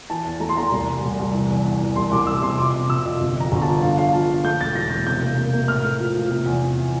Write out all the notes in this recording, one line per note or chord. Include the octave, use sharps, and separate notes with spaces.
E3 A5
E2
A3 A#5
C6
E2 A#5
C2
G3
C2
C2
E3
E2
E2
E3
C2 C6
C2 D6
C2 E6
C3 C6
F2 D6
C3
C3 E6
F2
G1
F2 A#5
G1
A5
F3
D3 F5
D3 F5
F3 A5
D3
A3 G6
E1 A6
E3 A#6
E1 A6
C3 G6
A#3
A#3
A#3
A2 F6
A3
F3
F3
C3
E2
E3